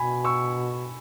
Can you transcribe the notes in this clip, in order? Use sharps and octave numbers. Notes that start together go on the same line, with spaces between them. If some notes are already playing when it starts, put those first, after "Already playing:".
Already playing: B2 G#5 B5
C#6 E6